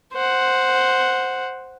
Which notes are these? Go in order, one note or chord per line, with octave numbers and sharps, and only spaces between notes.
C5 F#5